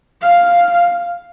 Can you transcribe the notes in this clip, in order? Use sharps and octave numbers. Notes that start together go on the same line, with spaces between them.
F5